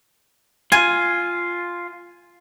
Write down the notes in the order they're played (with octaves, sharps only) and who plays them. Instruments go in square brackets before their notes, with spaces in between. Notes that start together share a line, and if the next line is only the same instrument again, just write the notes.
[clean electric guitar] F4 [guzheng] G#5